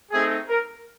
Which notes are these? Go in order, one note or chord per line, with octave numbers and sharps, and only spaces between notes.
A3 C4 D#4 G#4
A#4